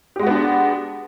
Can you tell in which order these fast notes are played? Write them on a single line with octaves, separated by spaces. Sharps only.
G4 G#3 F#4 B3 D4